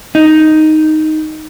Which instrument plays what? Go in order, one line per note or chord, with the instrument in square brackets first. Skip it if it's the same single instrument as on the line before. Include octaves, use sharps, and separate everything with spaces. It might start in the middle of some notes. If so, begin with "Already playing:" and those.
[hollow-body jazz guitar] D#4